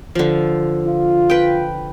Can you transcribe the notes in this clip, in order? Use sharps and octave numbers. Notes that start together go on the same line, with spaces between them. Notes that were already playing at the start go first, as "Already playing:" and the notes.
D3 F3
F4
B4 G5